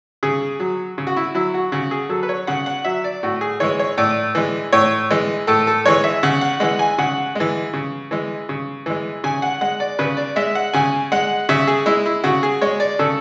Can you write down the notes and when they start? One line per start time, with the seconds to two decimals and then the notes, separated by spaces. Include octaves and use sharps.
0.23 C#3 G#4
0.60 F#3
0.98 C#3
1.07 F#4
1.17 E4
1.35 F#3 E4
1.54 F#4
1.72 C#3 F#4
1.91 G#4
2.09 F#3 A4
2.23 B4
2.29 C#5
2.47 C#3 F#5
2.66 F#5
2.85 F#3 E5
3.04 D5
3.23 A2 F#4
3.41 G#4
3.60 E3 G#3 C#5
3.79 C#5
3.98 A2 D5
4.35 E3 G#3
4.73 A2 C#5
5.10 E3 G#3
5.47 A2 A4
5.67 A4
5.85 E3 G#3 C#5
6.04 E5
6.23 C#3 F#5
6.41 F#5
6.60 E3 G#3 F#5
6.79 G#5
6.98 C#3 F#5
7.35 E3 G#3
7.73 C#3
8.11 E3 G#3
8.49 C#3
8.86 E3 G#3
9.24 C#3 G#5
9.42 F#5
9.61 G#3 F#5
9.80 D5
9.99 C#3 B4
10.17 D5
10.36 G#3 E5
10.55 F#5
10.74 C#3 G#5
11.12 G#3 F#5
11.49 C#3 E5
11.67 G#4
11.86 G#3 E4
12.06 E4
12.24 C#3 F#4
12.43 G#4
12.61 G#3 C#5
12.80 D5
12.99 C#3 A4